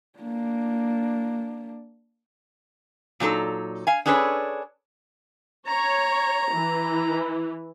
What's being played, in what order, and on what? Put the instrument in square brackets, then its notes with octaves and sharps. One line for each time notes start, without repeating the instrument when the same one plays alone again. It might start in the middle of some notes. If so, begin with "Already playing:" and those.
[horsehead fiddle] A#3 D4
[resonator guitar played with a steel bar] A#2 F#3 D#4 A4
F5 G#5
C#4 D4 G#4 A4 B4 C#5
[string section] C#5 [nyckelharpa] A#5
[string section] E3